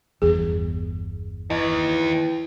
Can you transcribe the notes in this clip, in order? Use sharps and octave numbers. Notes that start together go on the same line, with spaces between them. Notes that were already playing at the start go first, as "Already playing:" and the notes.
G1 E2 G#4
D#2 E3 D#5